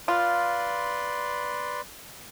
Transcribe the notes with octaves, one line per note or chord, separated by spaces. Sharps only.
F4 B4 D5 C6